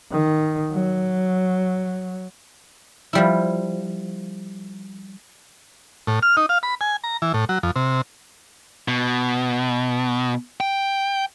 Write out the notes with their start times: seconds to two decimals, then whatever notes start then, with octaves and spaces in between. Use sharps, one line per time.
0.11 D#3
0.71 F#3
3.13 F3 G3 E4
6.07 A2
6.23 F6
6.37 D#4
6.49 F5
6.63 B5
6.81 G#5
7.04 A#5
7.22 E3
7.34 A2
7.49 F#3
7.63 F2
7.76 C3
8.88 B2
10.60 G5